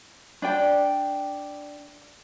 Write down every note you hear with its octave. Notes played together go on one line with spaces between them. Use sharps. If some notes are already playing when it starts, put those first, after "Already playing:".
D4 D5 G5